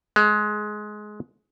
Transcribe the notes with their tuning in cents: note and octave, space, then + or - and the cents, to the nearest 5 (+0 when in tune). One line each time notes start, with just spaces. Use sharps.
G#3 +20